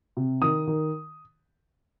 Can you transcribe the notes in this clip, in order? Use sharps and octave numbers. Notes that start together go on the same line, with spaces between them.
C3
D#3 D#6
D#3